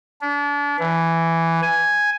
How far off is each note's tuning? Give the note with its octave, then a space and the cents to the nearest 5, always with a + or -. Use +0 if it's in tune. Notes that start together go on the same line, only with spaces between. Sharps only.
D4 -35
E3 +5
G#5 +0